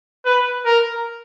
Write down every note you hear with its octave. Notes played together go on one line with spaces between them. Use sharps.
B4
A#4